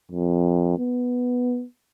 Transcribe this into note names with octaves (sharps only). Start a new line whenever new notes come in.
F2
B3